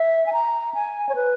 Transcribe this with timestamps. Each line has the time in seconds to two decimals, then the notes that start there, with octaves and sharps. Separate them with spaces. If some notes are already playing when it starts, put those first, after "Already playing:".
Already playing: E5
0.26 G#5
0.33 A#5
0.75 G#5
1.09 C#5
1.16 B4